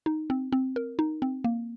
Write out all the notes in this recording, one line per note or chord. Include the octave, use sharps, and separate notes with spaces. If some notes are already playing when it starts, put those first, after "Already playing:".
D#4
C4
C4
A#4
D#4
C4
A#3